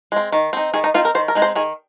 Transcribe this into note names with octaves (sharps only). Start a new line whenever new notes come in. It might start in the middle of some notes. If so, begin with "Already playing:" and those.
G#3 C4
D#3
C4 D#4
D#3 G#4
D#4
C4 D#4 F4
A#4
D#3 C5
A#4
G#3 C4 D#4
C5
D#3 G#4